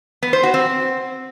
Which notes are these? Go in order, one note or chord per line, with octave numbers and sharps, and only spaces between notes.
B3
C5
F#4
C4